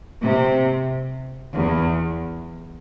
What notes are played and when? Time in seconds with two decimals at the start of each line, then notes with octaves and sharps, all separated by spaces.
0.20 C3
1.55 E2